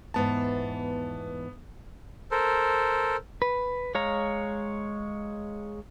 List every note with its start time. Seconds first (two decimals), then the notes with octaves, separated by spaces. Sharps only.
0.14 E2 G#2 E3 B3 A5
2.31 A4 A#4 C5
3.42 B4
3.95 G#3 C#5 F5 A#5